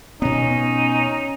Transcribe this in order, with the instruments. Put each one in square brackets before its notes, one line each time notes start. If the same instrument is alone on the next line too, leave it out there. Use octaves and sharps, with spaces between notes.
[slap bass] B2 B3 [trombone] C#4 [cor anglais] D#4